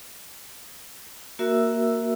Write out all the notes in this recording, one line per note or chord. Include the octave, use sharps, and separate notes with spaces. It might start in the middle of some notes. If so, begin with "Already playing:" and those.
A#3 F#4 A#4 E5 E6